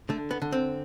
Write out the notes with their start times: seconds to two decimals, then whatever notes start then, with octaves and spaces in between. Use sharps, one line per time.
0.09 D3 A3
0.31 B3
0.42 D3
0.52 C4